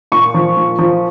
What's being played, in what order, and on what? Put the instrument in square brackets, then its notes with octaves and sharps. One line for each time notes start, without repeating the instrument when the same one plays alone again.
[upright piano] A#2 C#6
F3
A#2
F3